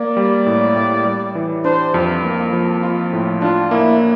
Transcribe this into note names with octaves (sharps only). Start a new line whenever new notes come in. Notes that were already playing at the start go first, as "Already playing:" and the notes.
Already playing: A#3 D5
G3
A2
A2
G3
E3
D4 C5
F2
A#3
F3
F4
A2
D4 F4
A#3 E4